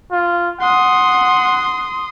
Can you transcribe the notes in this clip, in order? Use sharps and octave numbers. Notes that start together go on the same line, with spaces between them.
F4
F#5 C6 D#6